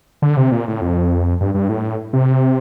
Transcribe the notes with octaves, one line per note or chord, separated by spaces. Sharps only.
D3
C3
A#2
A2
F2
G2
G2
A2
C3